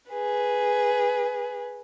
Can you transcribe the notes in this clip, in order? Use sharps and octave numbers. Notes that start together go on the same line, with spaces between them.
G#4 B4